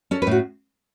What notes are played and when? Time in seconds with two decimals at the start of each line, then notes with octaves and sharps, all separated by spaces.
0.11 C#4 A4
0.22 B4
0.27 A2 F#4